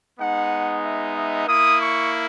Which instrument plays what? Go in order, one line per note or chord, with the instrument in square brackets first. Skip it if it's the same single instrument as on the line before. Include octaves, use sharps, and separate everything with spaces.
[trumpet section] G#3 B3 D#4 F#5
E5
E5
A#3 E4 D#6
C#6